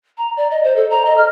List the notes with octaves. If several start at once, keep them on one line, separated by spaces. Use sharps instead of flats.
A#5
D5
D#5
C5
A4
A#5
D#5
F6